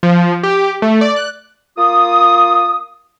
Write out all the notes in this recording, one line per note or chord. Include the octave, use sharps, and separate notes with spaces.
F3
G4
A3
D5
F#6
A#3 F4 D#6